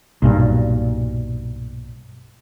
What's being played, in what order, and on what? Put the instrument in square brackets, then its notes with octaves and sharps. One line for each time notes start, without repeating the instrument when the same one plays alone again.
[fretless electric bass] B1 G2 A#2